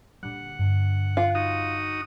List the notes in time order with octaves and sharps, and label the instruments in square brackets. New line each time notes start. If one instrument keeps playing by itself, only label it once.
[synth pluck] A#2 D3 G3 [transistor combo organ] F#5
[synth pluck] G2 D3
[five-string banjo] F4
[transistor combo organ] D#4 F#4 D#6